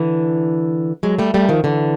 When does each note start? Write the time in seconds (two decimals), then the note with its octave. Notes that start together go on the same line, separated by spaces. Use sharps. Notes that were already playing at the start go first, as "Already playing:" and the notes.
Already playing: D3 E3
1.03 F#3 G#3
1.18 G3 A3
1.34 G3 A3
1.49 D#3 F3
1.64 D3 E3